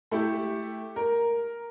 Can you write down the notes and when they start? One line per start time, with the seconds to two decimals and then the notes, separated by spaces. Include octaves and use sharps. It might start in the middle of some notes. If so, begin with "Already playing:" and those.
0.11 A3 E4 G4
0.96 A#4